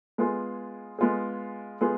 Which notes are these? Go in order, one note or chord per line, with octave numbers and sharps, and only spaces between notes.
G#3 B3 F4 G#4
G#3 B3 F4 G#4
G#3 B3 F4 G#4